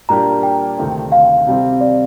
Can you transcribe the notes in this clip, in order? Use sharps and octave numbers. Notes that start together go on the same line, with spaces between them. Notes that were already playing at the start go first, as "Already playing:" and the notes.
A#2 G3 A#3 D4 G4 A#5
G5
D2 C3 D#3 A3 C4
F5
C3 G3 C4
D5